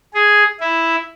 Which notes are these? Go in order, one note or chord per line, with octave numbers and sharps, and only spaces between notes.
G#4
E4